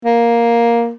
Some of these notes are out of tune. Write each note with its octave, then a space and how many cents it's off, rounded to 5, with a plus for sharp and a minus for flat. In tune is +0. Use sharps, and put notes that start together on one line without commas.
A#3 +5